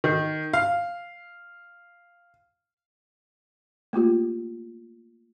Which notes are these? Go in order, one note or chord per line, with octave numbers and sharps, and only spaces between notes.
D#3
F5
A3 A#3 F4 G4